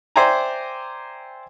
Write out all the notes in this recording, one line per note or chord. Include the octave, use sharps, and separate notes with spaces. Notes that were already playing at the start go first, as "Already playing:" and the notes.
C5 D5 E5 G5 G#5 A#5